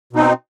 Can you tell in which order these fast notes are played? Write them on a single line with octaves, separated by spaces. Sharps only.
B2 D#4 C4